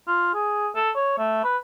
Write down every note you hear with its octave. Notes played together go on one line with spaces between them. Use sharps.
F4
G#4
A4
C#5
A3
B4